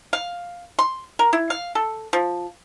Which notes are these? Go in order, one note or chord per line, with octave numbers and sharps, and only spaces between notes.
F5
C6
A#4
E4
F5
A4
F3